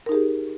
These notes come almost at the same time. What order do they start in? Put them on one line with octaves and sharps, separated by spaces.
A#4 D#4 G#4 G4